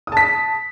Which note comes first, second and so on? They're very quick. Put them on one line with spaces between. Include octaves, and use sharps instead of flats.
D#6 A5 B6